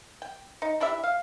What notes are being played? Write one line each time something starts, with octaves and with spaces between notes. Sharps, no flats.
G5
D#4
D4 E4 G4 E5
F5